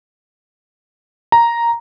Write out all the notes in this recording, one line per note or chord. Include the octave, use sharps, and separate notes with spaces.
A#5